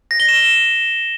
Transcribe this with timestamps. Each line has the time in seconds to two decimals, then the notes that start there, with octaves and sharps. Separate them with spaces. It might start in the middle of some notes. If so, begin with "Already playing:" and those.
0.11 A#6
0.20 G7
0.29 E7